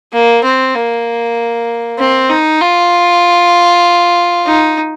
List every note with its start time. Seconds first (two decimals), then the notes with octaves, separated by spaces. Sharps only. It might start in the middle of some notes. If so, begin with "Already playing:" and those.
0.13 A#3
0.44 C4
0.75 A#3
1.99 C4
2.30 D#4
2.61 F4
4.46 D#4